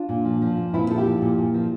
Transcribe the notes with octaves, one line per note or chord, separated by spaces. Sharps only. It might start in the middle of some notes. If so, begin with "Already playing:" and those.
Already playing: D4 F4
A#2
F3
F3
A#2
A#2 C4 E4
F3 A4
E4 G4
F3
A#2
A#2
F3